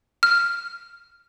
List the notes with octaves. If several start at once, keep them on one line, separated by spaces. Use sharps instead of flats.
F6